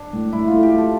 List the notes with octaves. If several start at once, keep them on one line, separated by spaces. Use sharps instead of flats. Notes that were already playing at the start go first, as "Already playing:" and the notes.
Already playing: D4
A2
A2 E4
F4
A3
G4
A3 A4